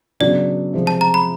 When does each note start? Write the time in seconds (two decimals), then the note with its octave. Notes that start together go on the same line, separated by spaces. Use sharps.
0.20 C#3 F#3 B3 D4 D5
0.73 C3 F3 G#3
0.87 A5
1.01 A#5
1.14 B5